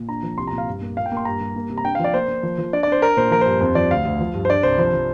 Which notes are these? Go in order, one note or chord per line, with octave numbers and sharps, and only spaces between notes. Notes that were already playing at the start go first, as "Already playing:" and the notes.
Already playing: A#2
D4 A#5
F3
C2 C6
A#5
A#2
F5
G2
A#3
A#2 F5
G5
A#3
C6
G2 A#5
G3
A#3
C3
A#5
D4 G5
F5
F3
D5
A#3 C5
A#3
F3
F3
D4 D5
D5
D4 C5
D4 A#4
A#2 C5
F3 A#4
C5
G2
F2 C5
F3 D5
D2 F5
D2
F3
G2
C5
D4 D5
C2 C5
F3 C5
F3